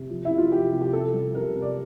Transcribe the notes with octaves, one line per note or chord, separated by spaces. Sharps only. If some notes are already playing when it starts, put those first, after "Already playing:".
Already playing: C3
F3
C3 E4
F4
F3 G4
C3
G4
C3 A4
G3
C3 A#4
C3
D5